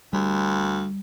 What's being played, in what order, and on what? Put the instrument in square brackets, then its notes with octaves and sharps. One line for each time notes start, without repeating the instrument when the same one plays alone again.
[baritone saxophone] D2 [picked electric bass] G3